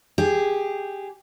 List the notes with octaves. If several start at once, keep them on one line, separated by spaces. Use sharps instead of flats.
G4 G#4